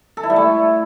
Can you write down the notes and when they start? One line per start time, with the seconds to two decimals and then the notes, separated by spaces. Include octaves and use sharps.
0.17 A4
0.23 E4
0.30 G3
0.36 A3